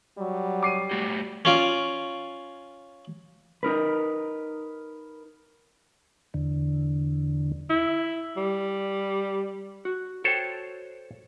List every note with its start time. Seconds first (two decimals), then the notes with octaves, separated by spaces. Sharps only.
0.18 F#3 G3
0.63 D6 C7 D#7
0.91 A3 F#4 G4
1.45 C#4 F4 D5
3.63 D#4 A#4 B4
6.34 E2 D3
7.70 E4
8.37 G3
9.85 F#4
10.24 F#4 A4 C5 C#5 G5